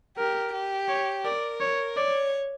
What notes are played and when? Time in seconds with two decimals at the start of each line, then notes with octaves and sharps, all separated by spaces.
0.18 G4 A#4
0.53 G4
0.89 C#5
1.24 A#4 D5
1.61 C#5
1.97 C#5 D5